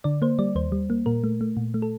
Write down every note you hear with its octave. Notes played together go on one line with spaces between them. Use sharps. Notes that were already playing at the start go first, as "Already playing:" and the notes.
D3 D5
A#3 C5
G3 D5
D#2 C5
G3
A#3
A#2 A#4
A3
A3
A#2
A3
A4